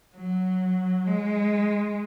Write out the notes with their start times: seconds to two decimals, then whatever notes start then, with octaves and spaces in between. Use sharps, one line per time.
0.16 F#3
1.06 G#3